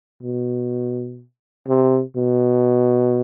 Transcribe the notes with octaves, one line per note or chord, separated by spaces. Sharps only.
B2
C3
B2